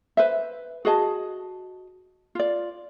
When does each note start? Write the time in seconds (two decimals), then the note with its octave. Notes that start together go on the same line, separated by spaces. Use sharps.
0.17 B4 C5 E5
0.85 F#4 G#4 D#5 A5
2.35 F4 D5